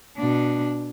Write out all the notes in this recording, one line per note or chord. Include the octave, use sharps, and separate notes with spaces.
B2 D4